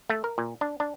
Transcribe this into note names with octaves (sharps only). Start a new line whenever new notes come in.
A3
A#4
A#2
D4
D4